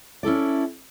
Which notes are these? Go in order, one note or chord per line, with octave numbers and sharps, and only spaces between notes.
C#4 E4 A4 D5